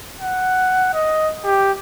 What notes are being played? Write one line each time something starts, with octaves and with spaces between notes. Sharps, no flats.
F#5
D#5
G4